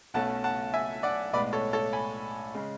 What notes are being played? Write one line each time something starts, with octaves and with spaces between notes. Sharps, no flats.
B1 B2 A3 C#4 F#5 A5
F#5 A5
E5 G#5
D5 F#5
B1 A2 G#3 B3 B4 D5
A4 C#5
A4 C#5
G#5 B5
C#3 G#3 C#4